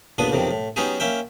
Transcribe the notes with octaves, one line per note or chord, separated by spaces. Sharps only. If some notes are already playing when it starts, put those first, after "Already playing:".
A1 A#2 B3 D4 D#6
B1 F2 C3 D#3
A2
F#3 B3 C#4 D#4 G4 G#4
A#3 C#4 E5 G5